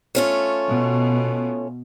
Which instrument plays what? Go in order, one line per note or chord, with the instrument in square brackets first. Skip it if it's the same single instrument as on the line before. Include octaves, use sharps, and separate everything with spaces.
[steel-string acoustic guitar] A3 C#4 F4
[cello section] B2